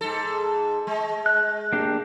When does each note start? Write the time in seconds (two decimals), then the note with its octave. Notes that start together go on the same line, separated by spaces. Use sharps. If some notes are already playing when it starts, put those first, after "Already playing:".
0.01 G#2 A4
0.87 G#3
1.26 F#6
1.73 A#3 D4 G4